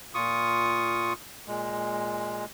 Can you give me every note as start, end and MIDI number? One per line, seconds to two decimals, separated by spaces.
0.14 1.13 46
0.14 1.13 65
0.14 1.13 85
0.14 1.13 87
1.48 2.45 46
1.48 2.45 56